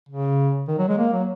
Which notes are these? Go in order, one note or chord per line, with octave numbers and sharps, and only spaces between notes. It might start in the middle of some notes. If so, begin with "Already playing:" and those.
C#3
D#3
F#3
G#3
A#3
F#3